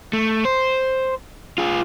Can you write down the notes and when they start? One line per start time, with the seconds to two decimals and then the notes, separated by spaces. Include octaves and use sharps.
0.13 A3
0.45 C5
1.58 F4 G#4